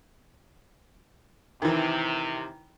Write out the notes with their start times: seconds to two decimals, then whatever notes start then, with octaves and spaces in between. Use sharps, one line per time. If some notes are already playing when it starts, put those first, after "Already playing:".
1.62 C3 D#3 E3